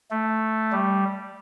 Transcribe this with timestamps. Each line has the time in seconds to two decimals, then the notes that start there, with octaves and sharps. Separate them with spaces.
0.11 A3
0.72 G3